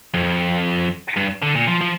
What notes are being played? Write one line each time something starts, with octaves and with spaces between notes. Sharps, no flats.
F2
G2
D3
A#2
F3
F3